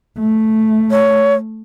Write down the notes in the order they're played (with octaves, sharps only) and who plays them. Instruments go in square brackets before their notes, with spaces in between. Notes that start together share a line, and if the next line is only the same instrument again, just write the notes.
[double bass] A3
[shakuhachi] C#5